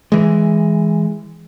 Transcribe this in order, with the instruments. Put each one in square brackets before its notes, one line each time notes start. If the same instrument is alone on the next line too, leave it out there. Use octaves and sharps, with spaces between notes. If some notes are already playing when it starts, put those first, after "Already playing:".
[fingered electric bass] E3 G#3